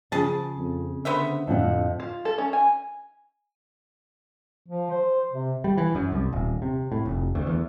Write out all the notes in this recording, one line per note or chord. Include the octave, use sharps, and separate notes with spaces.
C#3 F3 G#4 A5
F2
D3 B3 C5 E5
F2 A2 F#5
F4
A4
C#4
G#5
F3
C5
C3
G3
E3
F#2
C2
D#1
C3
A2
F1
D2
E2